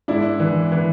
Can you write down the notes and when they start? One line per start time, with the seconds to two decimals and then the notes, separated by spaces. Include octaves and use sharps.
0.08 G#2 D4 E4
0.40 E3
0.72 E3